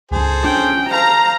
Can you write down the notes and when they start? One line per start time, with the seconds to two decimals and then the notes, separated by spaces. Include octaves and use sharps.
0.12 C#2 G2 G#4 A4 C5
0.44 C#4 D4 G5
0.91 A4 C5 F5 A#5